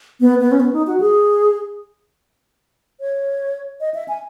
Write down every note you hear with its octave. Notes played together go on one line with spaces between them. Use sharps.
B3
B3
C#4
B3
D#4
F#4
G#4
C#5
D#5
E5
G#5